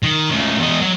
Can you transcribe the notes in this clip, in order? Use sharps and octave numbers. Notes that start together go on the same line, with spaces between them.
D#3
C#2 A3
E2 D#5
F#3